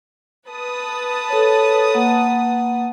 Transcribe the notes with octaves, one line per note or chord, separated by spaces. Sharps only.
B4 A5 D#6
A4 C#5
A#3 F#5